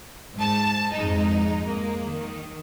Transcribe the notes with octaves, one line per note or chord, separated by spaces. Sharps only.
G#2 A5
F2 G#2 G#3 D#4
G#3 A#3
D#3